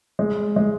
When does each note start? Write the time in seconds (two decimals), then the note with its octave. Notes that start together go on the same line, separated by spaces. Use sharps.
0.19 G#3
0.56 G#3